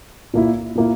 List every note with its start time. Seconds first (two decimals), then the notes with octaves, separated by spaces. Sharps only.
0.34 A#2 A#3 E4
0.75 A#2 A#3 E4